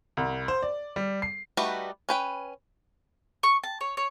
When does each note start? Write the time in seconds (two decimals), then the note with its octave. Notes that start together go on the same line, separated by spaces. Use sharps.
0.17 C2
0.48 C5
0.63 D5
0.96 G3
1.22 C7
1.57 G3 A3 D#4 F#4 B4
2.09 C#4 B4 G5
3.43 C#6
3.64 A5
3.81 C#5
3.97 C#5